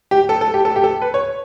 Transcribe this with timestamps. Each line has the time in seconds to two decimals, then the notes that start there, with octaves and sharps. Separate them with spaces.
0.11 G4
0.29 A4
0.41 A4
0.54 G4
0.65 A4
0.76 G4
0.84 A4
1.02 B4
1.14 C#5